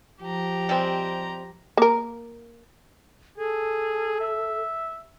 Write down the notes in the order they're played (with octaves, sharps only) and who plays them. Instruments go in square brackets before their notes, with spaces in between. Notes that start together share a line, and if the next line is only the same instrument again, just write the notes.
[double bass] F3 [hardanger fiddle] G4 A#5
[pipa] G3 G#3 C4
[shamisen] A#3 A#4
[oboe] G#4 [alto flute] A4
[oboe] E5